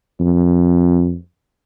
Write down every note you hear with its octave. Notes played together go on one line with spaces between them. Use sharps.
F2